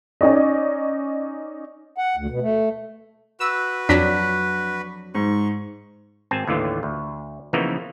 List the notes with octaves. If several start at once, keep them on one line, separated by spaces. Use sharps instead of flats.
C#4 D#4 D5 D#5
F#5
D2
B2
A3
F#4 B4 E6
F2 F#3 D4 B6
G#2 C#6
G#1 C4 G#5 A5
D#2 A2 D3 E3 F4
D2
C#3 E3 F3 A#3 B3 D#4